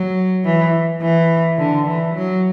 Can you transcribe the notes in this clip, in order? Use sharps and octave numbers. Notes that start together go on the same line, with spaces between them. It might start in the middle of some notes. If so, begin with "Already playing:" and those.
Already playing: F#3
E3
E3
D3
E3
F#3